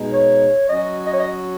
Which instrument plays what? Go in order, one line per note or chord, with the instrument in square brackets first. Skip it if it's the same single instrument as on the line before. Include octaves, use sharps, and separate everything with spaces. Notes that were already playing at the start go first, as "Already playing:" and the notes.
Already playing: [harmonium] B2 G#3 D#4
[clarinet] C#5
[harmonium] F#3 C#4 F#4 [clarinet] D#5
[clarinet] D#5
C#5
D#5